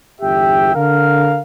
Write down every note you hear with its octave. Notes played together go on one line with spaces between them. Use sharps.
G1 E2 G4 E5 G5
D3 A#4 F5